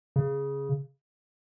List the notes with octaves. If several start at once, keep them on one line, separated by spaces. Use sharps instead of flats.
C#3